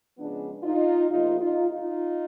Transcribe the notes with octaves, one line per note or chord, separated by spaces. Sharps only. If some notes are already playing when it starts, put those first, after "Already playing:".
C#3 F3 G#3 B3 D4
D#4 F4
E2 C3 F3 A#3 D#4 F4
D#4 F4
D#4 F4